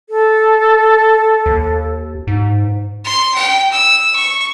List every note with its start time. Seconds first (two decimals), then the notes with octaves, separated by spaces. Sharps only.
0.10 A4
1.46 D#2
2.27 G#2
3.04 C6
3.34 G5
3.71 E6
4.16 C#6